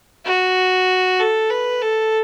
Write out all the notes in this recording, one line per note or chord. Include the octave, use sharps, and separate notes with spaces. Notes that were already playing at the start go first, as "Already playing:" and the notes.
F#4
A4
B4
A4